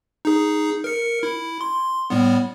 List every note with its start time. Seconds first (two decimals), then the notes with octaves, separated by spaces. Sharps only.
0.25 D#4 G#4
0.84 A#4 C#7
1.23 E4
1.61 C6
2.10 A2 G3 B3